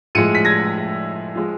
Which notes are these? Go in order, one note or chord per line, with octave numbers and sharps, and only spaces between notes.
A2 F3 G#3 C#7 D#7
B6
G#6 A#6
F3 G#3